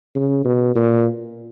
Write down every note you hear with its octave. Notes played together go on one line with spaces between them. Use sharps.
C#3
B2
A#2